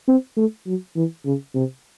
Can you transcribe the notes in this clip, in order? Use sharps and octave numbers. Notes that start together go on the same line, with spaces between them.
C4
A3
F#3
E3
C#3
C3